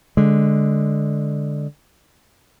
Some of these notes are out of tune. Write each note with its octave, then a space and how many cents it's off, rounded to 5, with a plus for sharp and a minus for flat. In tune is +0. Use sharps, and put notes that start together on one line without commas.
D3 +0 G#3 +0